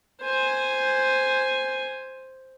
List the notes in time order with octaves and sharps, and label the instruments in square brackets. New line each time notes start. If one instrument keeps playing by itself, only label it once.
[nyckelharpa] C5 G#5